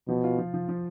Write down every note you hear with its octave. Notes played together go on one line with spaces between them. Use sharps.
B2 F3
F4
F3
F3
F3